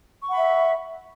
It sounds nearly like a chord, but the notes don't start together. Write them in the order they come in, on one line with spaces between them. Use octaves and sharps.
C#6 F#5 B5 E5